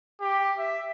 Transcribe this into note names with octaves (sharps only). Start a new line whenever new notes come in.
G4
E5